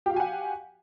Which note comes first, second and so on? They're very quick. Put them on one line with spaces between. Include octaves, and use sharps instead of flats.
G4 F5 F#4 G#5 F#5